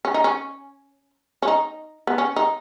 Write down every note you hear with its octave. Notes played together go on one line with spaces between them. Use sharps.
C#4
D#4
C#4
C#4
D#4
B3
C#4
D#4